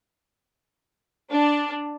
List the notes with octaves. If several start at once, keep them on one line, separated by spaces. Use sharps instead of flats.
D4